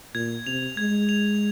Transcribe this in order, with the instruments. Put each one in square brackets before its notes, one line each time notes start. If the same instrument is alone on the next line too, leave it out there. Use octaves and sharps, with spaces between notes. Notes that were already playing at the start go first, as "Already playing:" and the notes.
[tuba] A#2 [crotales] G#6
[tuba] C3 [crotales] F7
[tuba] G#3 [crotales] G#6
[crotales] F7